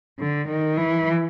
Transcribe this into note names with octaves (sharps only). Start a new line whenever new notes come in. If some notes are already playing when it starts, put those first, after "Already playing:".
D3
D#3
E3